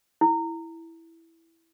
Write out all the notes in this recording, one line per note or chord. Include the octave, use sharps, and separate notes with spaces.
E4